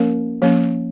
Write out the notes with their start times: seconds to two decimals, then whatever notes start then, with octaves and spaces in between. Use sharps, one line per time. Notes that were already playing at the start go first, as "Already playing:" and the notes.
Already playing: F3 A#3 C#4 A#4
0.42 F3 A#3 C#4